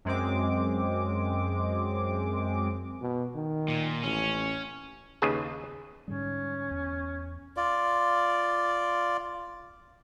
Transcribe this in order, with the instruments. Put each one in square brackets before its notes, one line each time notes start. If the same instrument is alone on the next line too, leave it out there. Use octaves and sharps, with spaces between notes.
[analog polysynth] F#2 G#3 C4 D6
[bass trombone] B2
D#3
[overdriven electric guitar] A#2
[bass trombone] A1 [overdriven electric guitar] C#4
[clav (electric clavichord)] D#2 C#3 G#4 B4 A5
[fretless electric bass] G#2 D3 G3 [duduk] C#4
[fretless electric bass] E2
[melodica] F4 D5